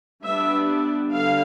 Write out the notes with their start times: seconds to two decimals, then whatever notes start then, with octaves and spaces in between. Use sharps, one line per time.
0.23 G3 B3 D4 E5
1.12 D3 G3 F5